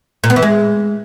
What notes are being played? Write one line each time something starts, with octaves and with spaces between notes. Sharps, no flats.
A#2
B3
E3
G#3